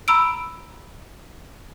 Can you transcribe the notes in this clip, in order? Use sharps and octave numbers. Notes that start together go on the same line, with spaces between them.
A#5 B5 E6 D7